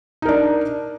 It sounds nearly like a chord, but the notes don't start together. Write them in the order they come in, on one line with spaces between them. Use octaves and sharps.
D#4 A#4 D4